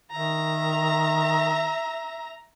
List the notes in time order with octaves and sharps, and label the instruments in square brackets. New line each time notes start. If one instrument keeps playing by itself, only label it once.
[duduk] D#3 [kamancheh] E5 A#5